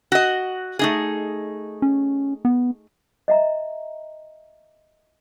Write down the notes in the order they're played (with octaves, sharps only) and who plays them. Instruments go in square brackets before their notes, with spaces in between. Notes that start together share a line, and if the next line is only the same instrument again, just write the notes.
[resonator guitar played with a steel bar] F#4 D#5
A3 D#4 G#4
[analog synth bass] C#4
B3
[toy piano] D#5 E5 A#5